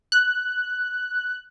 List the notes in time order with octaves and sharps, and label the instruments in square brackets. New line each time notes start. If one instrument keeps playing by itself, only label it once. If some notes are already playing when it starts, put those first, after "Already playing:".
[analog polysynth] F#6